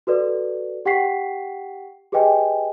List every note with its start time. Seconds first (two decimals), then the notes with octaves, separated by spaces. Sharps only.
0.07 F#4 A4 B4 D5
0.86 G4 F#5 G5 C#6 B6 C7
2.12 G4 G#4 B4 D#5 G5 G#5